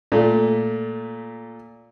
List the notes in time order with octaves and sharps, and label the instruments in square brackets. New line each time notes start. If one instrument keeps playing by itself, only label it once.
[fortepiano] A#2 A3